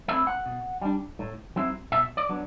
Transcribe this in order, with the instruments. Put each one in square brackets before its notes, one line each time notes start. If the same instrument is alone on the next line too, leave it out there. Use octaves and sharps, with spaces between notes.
[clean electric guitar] A3 C4 E4 E5
F#5
B2
G3 D4
A2
F#3 C4 E4
B2 E5
D5
F#3 B3 D4